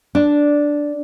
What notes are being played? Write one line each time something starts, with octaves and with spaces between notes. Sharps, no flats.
D4